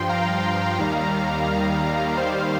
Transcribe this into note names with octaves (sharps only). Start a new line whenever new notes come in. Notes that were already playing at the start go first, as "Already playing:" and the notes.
Already playing: G2 F3 G5 C6
F5 A#5
D#2 D#3 G3
D#2 D#3 G3 C5 F5